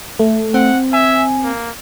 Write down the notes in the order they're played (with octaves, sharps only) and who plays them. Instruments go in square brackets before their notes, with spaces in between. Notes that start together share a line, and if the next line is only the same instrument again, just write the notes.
[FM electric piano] A3
[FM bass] C4 [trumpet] F#5
[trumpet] E5 [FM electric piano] G#5
[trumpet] A#3